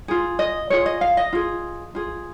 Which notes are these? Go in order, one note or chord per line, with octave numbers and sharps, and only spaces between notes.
F4 G#4
D#5
F4 G#4 C#5
D#5
F5
D#5
F4 G#4
F4 G#4